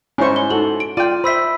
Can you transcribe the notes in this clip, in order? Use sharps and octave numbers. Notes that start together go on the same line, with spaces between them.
G#2 C#4 E4 C5 G#5 C#6
G#5 G7
D#4 F#4 A4 F#7
D7
F4 D5 G5 D#7
C5 E5 B5 E6 B6